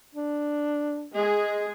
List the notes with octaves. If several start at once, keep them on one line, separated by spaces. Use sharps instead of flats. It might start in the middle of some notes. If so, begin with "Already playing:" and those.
D4
G#3 G#4 D#5